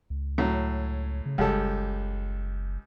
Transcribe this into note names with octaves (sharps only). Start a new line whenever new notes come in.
C#2
A2 F#3
C#3
F#1 C#2 G3 A4